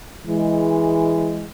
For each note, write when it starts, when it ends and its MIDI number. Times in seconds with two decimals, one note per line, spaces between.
0.25 1.49 52
0.25 1.49 56